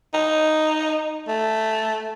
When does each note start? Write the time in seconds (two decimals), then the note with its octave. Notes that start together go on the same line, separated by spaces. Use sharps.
0.14 D#4
1.28 A3